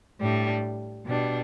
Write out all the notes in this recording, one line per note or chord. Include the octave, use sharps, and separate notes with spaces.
A2 G3 D4
B2 G3 D4